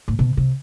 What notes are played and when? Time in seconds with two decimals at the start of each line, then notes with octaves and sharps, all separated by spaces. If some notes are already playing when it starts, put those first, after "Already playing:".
0.08 A2
0.19 B2
0.37 C3